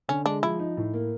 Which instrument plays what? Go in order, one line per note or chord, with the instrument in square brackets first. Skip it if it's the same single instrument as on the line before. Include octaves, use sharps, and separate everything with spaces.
[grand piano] D3 [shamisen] C#4
[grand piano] G#3 [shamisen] D4
[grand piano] F3 [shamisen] E4
[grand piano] D#4
A2
A#3